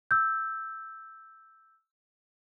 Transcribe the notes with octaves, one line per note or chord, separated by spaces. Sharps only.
E6 G6